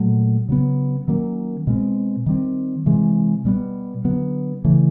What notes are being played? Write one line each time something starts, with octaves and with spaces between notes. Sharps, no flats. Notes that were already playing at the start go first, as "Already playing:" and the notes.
Already playing: A#2 F#3 A3
C#3 F#3 B3
D#3 F#3 A#3 C#4
B2 G#3 C4
D#3 G3 C4
C3 E3 G#3
B2 G3 B3
D3 F#3 B3
C#3 E3 A3